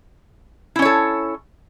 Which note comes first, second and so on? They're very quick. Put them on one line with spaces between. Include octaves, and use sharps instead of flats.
E4 C#4 C#5 A4